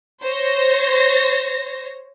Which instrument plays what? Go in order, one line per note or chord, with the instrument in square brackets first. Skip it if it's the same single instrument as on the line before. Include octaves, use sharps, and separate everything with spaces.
[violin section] C5 C#5 A#6